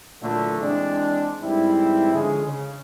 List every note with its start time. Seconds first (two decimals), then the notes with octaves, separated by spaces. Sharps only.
0.22 A#2 D3 E3 F#3 A3
0.61 E3 G#3 C4 D4
1.42 G#2 E3 G3 C4 E4
2.15 D3 F3 G#3 C#4 G#4
2.46 C#3